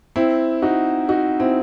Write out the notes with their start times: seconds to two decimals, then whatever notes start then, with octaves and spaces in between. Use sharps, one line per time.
0.16 C4 E4
0.62 D#4 F#4
1.09 D#4 F#4
1.40 C4 E4